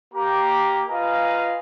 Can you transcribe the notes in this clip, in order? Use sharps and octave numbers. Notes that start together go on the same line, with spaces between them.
A#3 G4 A#5
F4 B4 D#5 F5 G#5 A#5